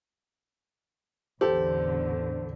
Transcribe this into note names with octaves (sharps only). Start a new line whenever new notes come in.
A1 E2 D3 G4 A4 C5